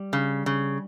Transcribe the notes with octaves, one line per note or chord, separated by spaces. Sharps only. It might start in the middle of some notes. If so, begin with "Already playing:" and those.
Already playing: G3
C#3
C#3